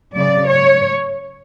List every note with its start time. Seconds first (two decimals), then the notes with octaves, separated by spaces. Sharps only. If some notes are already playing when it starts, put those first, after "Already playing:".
0.14 C#3 F#3 D5
0.49 C#5